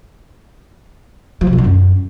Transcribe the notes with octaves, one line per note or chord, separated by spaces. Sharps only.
F3
C3
D#3
D3
F#2